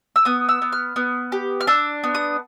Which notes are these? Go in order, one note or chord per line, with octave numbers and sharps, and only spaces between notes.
E6
B3 D#6
E6
B3
F6
B3
G4
F6
D4 E6
B3
D#6